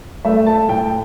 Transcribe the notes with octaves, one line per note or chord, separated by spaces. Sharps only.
A3 E5
A5
A2 G5